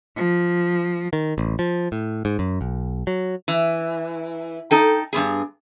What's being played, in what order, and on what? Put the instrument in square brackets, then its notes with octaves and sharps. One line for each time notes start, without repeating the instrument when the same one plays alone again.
[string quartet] F3
[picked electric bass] D#3
A1
F3
A2
G#2
F#2
B1
F#3
[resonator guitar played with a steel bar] E3
D#4 A4 G5
G2 F#3 B3 G#4